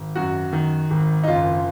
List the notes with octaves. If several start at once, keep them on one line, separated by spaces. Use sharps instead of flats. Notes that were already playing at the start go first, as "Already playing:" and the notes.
Already playing: G#1
F#2 F#4
D#3
G#1
D#4
F#1 F4